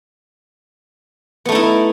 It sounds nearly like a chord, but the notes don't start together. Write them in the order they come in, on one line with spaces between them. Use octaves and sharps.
B3 A3 D#4 E4